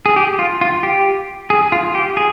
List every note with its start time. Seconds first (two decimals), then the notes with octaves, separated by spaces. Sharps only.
0.06 G#4
0.16 G4
0.39 F4
0.61 F4
0.83 G4
1.50 G#4
1.72 F4
1.95 G4
2.17 G#4